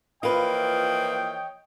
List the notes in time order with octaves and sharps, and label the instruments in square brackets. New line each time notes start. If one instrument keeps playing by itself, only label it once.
[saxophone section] E3 F3 A#3 [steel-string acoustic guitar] F4 B4 [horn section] C#5 D#5 G5